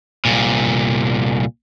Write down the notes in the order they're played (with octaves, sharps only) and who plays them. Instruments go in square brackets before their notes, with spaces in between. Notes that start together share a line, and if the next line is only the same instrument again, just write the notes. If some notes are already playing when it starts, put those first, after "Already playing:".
[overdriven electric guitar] C2 A#2